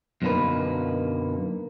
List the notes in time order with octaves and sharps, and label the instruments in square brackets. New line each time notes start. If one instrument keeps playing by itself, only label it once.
[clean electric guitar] F#2 B2 D3 A#3 D#4 B4